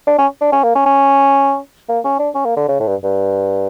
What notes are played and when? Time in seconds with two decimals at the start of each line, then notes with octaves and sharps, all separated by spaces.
0.07 D4
0.18 C#4
0.41 D4
0.52 C#4
0.64 A#3
0.75 C#4
0.86 C#4
1.89 A#3
2.04 C#4
2.19 D4
2.35 C#4
2.45 A#3
2.57 D3
2.68 C#3
2.80 A2
2.87 G2
3.04 G2